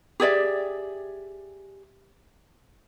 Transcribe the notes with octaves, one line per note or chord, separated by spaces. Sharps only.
G4 G#4 D5 E5